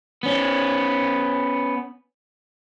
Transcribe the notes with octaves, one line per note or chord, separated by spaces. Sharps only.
B3 C#4